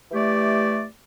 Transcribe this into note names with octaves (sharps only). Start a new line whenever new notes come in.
E3 A3 G4 D5